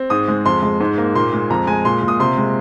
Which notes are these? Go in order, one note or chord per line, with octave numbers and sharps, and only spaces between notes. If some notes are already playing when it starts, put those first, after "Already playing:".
Already playing: C4
G#2 D#6
G#3
F2 C6
G#3
G#2
A#3
A#2 C6
G#3
F2 A#5
G#3 G#5
A#2 C6
A#2
D#6
C3 C6
G#3